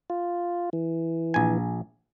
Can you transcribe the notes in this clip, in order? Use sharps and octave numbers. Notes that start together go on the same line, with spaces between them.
F4
E3
A#1 G#5